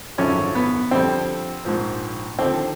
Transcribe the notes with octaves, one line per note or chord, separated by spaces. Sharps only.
G#1 F#2 D3 F3 C#4
B3
F2 D3 G3 C4
A#1 G#2 F3
D#2 D3 F3 C4